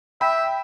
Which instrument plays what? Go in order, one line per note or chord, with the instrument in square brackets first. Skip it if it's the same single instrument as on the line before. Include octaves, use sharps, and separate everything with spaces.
[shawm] E5 [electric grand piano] G5 B5